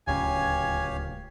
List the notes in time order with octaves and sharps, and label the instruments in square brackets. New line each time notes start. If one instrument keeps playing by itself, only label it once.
[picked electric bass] D1 C#2 [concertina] G4 C#5 F5 [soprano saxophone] G#5